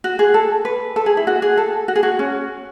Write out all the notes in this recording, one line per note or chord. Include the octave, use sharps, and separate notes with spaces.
F#4
G#4
A4
B4
A4
G#4
E4
F#4
G#4
A4
F#4
G#4
F#4
C#4